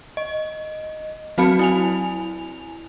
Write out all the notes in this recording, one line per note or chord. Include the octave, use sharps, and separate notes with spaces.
D#5
F#3 C4 F#4 A5 B5 C#7
E4 G#5 F7